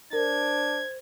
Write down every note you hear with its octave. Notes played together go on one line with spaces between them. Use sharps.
D4 A#4 C5 G#6